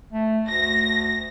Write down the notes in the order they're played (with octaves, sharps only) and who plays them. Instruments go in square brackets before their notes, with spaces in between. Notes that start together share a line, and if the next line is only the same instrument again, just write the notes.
[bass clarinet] A3
[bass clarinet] D2 [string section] A#6